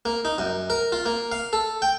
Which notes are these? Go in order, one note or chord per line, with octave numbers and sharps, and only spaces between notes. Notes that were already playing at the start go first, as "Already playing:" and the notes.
A#3
D#4
F#2
A#4
F4
A#3
F5
A4
G5